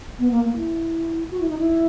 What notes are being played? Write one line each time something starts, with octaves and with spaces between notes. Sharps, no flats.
B3
A#3
A#3
E4
F#4
E4
D#4
E4